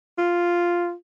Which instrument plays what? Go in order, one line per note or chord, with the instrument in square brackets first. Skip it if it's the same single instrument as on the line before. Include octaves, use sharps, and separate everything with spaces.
[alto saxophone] F4